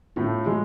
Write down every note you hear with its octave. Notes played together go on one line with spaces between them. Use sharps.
A2 A3 F4
E3 G#3